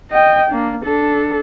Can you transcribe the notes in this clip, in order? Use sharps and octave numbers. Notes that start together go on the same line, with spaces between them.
D#5 G5
A#3 D4
D4 A4